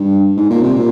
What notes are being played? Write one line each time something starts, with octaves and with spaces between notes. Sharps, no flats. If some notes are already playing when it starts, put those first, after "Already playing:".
Already playing: G2
G#2
A#2
C3
A#2